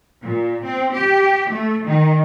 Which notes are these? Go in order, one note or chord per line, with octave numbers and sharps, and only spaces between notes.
A#2
C4
G4
A3
D#3